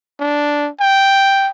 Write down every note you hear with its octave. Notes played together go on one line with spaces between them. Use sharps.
D4
G5